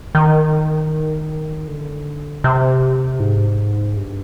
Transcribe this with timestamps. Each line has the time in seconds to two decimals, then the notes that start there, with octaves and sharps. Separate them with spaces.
0.15 D#3
1.68 D3
2.44 C3
3.20 G#2
3.97 G2